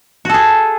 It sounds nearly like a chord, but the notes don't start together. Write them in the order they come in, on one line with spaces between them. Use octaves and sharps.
F#4 A4 G#4